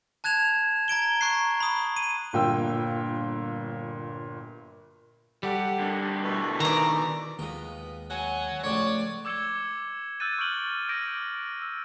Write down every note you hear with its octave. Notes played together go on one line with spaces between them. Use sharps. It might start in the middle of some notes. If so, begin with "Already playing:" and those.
A5 F#6 G#6 E7 F7
A#5 G#6 D7 G7
A#5 C#6 F#6 C7
B5 D#6
D#7
G1 A#2 G5 E6
G3 G4 A4 F#5
D3 A#3
B2 E3 A3
D#3 D5 A#5
D#2 G#3 B3 D#4 F4
F#3 F#5 G#5
C#2 A2 F3 C#5 D5
D6 E6 G#6 C#7 E7 G7
E6 F#6 G6 A6 D#7
C#6 F6 G6 D7 F#7 G7
D6 G6 A#6 D7 G7
E6